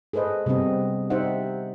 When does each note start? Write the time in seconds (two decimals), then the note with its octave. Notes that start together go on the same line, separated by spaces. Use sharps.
0.13 G#4 A4 B4 C5 D#5
0.46 C3 G3 B3 C4 D#5
1.10 D#4 G4 C5 D5 E5 F#5